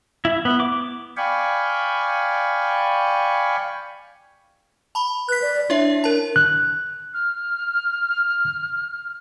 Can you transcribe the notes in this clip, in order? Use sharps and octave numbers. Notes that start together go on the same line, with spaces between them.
E4
B3
D6
D5 F5 G5 G#5 B5 C#6
A5 B5
B4 F#6 B6
D5
D4 E4 C#5 E5
A#4 A5
F#6
F6